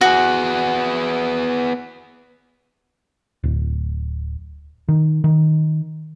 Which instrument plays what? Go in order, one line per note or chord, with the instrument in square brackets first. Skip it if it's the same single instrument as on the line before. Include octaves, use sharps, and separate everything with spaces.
[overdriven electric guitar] B3 G#4 [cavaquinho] F#4
[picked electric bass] D1
D#3
D#3